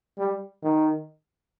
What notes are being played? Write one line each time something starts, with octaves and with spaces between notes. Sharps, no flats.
G3
D#3